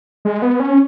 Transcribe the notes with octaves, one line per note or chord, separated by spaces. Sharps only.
G#3
B3
C#4